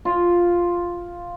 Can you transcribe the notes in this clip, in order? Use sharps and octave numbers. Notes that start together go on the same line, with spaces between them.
F4